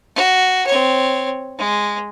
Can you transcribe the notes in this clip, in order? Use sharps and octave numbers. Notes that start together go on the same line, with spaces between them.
F#4
C4 C#5
G#3